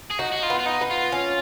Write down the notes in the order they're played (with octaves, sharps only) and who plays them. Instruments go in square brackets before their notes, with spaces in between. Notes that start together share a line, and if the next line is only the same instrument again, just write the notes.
[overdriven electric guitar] G#4
[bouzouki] D#4 [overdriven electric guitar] F#4
[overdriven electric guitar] F#4
F4
[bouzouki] B3
[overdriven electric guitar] F4
D#4
[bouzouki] B3
[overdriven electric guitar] F4
[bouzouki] C#4